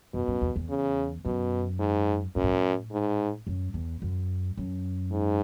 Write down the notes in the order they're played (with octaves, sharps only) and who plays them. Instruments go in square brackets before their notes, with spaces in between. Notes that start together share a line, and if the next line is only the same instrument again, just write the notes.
[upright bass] F#2 [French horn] B2
[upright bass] F#2
E2
E2
[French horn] C#3
[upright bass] F#2 [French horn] B2
[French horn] G#2
[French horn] F#2 [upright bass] A2
[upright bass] G#2
A2
[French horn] G#2
[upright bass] F#2
E2
F#2
F#2
[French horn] G#2